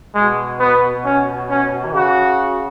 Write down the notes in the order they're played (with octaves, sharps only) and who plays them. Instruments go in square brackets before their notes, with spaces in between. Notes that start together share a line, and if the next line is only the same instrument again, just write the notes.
[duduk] B2 [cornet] G#3
[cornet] B3
C#4
C#4
[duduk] E3
[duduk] C#3 [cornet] F#4